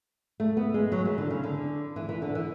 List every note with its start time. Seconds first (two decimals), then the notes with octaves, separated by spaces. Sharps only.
0.40 A3
0.57 B3
0.74 G#3
0.92 F#3
1.05 E3
1.18 D3
1.30 C#3
1.44 D3
1.96 E3
2.09 E3
2.22 D3
2.35 E3